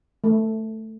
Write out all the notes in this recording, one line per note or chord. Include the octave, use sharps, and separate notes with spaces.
A3